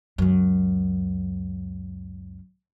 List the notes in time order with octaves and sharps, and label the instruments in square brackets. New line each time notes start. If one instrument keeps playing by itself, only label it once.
[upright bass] C#2 F#2